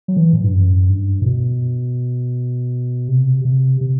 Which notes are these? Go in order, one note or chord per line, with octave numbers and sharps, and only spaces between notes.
F#3
E3
A2
G2
F#2
G2
A2
B2
C3
C3
C3